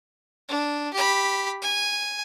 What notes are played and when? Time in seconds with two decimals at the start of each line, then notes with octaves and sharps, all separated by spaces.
0.49 D4
0.93 G4 B5
1.62 G#5